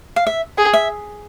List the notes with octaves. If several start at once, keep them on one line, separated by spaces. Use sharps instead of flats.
F5
E5
G#4
E5